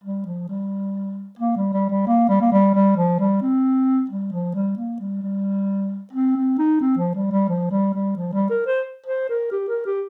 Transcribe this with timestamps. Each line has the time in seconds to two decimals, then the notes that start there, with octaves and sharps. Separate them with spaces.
0.04 G3
0.26 F3
0.49 G3
1.39 A#3
1.56 G3
1.73 G3
1.90 G3
2.07 A#3
2.29 G3
2.41 A#3
2.52 G3
2.74 G3
2.97 F3
3.20 G3
3.42 C4
4.10 G3
4.32 F3
4.55 G3
4.77 A#3
5.00 G3
5.22 G3
6.13 C4
6.36 C4
6.58 D#4
6.81 C4
6.97 F3
7.15 G3
7.31 G3
7.48 F3
7.71 G3
7.94 G3
8.16 F3
8.33 G3
8.50 A#4
8.66 C5
9.06 C5
9.29 A#4
9.51 G4
9.68 A#4
9.86 G4